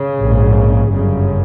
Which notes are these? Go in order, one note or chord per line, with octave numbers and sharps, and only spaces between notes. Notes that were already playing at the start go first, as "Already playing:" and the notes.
Already playing: C#3
A#1 G#2
G1 F#2 C#3